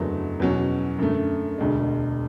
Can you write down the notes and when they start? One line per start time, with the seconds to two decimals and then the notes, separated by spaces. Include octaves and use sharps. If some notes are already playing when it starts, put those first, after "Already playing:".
Already playing: F#1 E2 D3 F#3 A3
0.40 E2 B2 F#3 C#4
0.99 F#2 D3 A3
1.58 E1 D2 D3 G#3